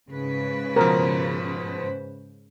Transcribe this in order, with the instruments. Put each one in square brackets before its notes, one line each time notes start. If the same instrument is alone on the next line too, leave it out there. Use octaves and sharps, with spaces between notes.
[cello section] G#2 C#3 B4
[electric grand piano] B2 F3 [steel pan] A#4 [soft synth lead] C5